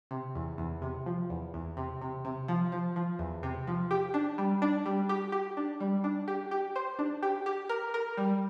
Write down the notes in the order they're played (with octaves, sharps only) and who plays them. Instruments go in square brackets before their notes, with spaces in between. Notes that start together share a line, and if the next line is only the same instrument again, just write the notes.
[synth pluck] C3
E2
E2
C3
F3
E2
E2
C3
C3
C3
F3
F3
F3
E2
C3
F3
G4
D4
G3
D4
G3
G4
G4
D4
G3
D4
G4
G4
C5
D4
G4
G4
A#4
A#4
G3